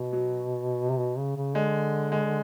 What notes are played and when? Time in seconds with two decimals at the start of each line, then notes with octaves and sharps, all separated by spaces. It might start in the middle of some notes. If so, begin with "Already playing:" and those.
Already playing: B2
0.13 F#3
0.89 C3
0.98 B2
1.18 C#3
1.36 C#3
1.55 D3 G#3
2.12 G#3